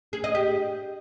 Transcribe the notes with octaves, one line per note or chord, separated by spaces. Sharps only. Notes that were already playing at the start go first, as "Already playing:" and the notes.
G#4
D#5
G4